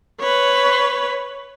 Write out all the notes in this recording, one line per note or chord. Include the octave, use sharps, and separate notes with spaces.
B4 C#5